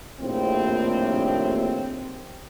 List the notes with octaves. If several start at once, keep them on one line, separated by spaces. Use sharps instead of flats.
A#1 D#2 A2 C4